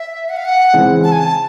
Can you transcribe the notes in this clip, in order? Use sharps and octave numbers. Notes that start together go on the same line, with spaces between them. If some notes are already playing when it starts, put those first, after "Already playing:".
Already playing: E5
F#5
F5
F#5
C#3 E3 G#3 C4
A5
G#5
A5